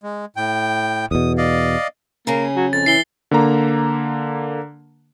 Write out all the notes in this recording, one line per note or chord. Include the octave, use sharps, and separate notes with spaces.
G#3
A2 G5
E2 B2 D#6
D5 D#5 F5
C#3 A#3 C#4 G#4
F#3
F2 A6
E3 C7 G7
D3 A#3 A#5